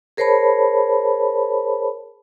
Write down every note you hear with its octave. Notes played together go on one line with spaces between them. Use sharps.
G#4 A#4 C5 C#5 A5 B5